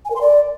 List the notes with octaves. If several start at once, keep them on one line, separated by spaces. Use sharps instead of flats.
G#5
A#4
C6
D5